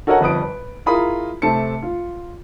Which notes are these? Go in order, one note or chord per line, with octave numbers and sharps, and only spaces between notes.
F#4 A4 A#4 C#5 D#5 F#5
G1 F2 B4 D#6 D7
B4
E4 F4 G#4 A#4 B5 D#6
C3 A3 C4 A5 C#7
F4